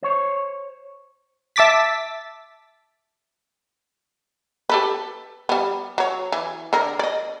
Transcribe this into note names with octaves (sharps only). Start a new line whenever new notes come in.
C5 C#5
E5 A5 D6 A6 B6
G4 A4 B4
G3 B3
F#3 C#5
E3
D3 A#4
D5 D#5